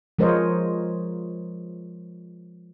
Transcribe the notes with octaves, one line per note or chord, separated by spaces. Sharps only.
F3 G#3 A#4 C5 C#5 D#5